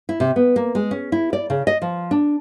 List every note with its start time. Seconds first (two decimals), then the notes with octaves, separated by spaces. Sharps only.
0.09 E4
0.20 C3
0.36 B3
0.56 A#3
0.75 G#3
0.91 C#4
1.12 E4
1.33 D5
1.50 C#3
1.67 D#5
1.82 F3
2.11 D4